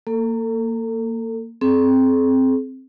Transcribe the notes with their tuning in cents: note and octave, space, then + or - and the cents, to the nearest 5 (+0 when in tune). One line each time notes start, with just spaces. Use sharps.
A#3 -20 A4 +30
C4 +0 G#4 +45